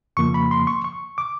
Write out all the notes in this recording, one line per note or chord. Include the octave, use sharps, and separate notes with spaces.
F2 C#3 F3 A#3 C#6
B5
C6
C#6
C#6
D6